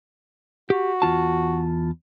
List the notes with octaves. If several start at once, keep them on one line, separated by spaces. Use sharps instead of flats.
F#4 G4
E2 F4 A5